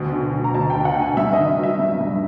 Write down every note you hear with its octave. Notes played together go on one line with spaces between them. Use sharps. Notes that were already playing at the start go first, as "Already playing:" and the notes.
Already playing: D2 B2
D3
F#3
A#5
D2 A5
D2 G5
F#5
D3 G#5
G2 E5
D#3 D#5
F#3 E5
G2
G2